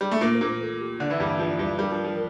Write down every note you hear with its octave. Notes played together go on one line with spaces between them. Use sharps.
G3
A3
A#2 A#3 A#4
C5
A#2 A#3
C5
A4
G4
D3 D4 D5
E3 E4
G2 G3
E3
F3
G2 G3
G2 G3 A#4
F3
F3